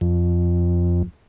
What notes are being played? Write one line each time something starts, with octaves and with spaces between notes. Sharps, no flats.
F2